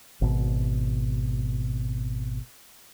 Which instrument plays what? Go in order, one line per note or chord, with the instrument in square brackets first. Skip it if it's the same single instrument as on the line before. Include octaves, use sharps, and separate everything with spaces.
[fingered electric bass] G#1 B2